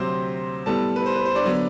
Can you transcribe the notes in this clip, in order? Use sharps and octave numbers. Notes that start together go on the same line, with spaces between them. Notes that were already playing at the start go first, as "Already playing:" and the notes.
Already playing: D2 C3 F#3 C4 C5 C6
A2 G3 B3 A4 A5
B4
C5
B4
C5
D4 D5
D3 F#3 B3